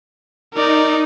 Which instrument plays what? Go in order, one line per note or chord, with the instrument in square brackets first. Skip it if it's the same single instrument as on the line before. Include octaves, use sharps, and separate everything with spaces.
[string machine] D#4 [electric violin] A#4 D5